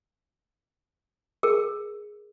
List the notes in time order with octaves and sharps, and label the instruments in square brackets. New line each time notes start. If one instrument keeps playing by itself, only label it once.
[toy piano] G#4 A#4